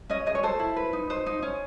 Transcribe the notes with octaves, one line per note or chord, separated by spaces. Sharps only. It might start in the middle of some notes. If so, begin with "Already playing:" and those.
C#4 D#5
G#4 D#5
C#5
A4 C5
E4
B4
D#4
D#4 C5
D#4
C#4